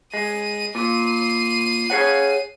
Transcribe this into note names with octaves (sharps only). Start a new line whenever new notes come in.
G#3 D#7
A#2 C7 D#7
G#4 C#5 F#5